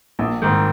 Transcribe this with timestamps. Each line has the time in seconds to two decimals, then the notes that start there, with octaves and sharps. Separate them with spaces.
0.19 A#1
0.42 G#2 D#3